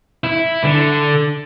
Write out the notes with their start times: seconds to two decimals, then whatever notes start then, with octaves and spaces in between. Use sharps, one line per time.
0.24 E4
0.64 D3